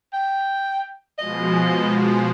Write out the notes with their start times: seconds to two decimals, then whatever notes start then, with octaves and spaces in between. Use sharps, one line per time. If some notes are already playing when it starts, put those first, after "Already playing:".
0.13 G5
1.18 B2 F3 G#3 D#5